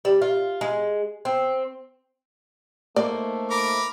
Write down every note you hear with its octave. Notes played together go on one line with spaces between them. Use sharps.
G3
F4
G#3
C4
A3 A#3 D#4 C5 D5
A#4 B5 D6